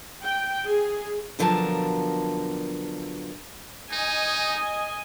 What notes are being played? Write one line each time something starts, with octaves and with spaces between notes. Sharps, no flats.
G5
G#4
B2 D3 F3 F#3 A#4 A5
D#4 D#5 G#5